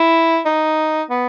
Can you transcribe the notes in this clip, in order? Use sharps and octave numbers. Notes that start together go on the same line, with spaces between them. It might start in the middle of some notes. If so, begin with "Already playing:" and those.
Already playing: E4
D#4
B3